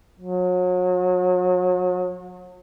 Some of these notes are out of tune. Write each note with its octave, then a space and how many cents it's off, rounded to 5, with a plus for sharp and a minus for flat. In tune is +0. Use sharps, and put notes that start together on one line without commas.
F#3 -35